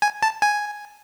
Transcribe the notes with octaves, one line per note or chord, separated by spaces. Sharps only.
G#5
A5
G#5